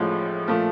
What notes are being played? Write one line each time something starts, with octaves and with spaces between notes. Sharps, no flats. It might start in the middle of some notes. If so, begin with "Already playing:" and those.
Already playing: A1 A2 F3 G#3
A#2 F3 A3